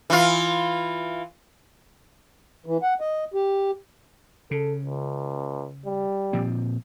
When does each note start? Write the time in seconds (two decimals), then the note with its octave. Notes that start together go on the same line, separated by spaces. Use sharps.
0.10 E3 F4
2.66 E3
2.82 F#5
3.00 D#5
3.34 G4
4.51 C#3 A4
4.85 C#2
5.85 G3
6.33 A#2 F3 C4